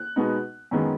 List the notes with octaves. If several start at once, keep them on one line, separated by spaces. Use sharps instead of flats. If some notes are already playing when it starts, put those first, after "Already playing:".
Already playing: F#6
B2 G#3 B3 D#4
F#2 D#3 G#3 B3